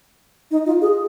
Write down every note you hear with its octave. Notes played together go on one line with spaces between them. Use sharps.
D#4
F4
G#4